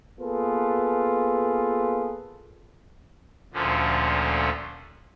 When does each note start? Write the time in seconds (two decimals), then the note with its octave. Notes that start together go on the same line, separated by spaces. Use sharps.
0.20 A#3 B3 F4 G#4 A4 B4
3.53 D2 A#2 D3 F3 C#4